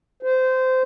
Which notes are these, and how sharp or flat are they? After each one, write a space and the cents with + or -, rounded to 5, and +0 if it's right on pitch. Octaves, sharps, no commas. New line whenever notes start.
C5 -20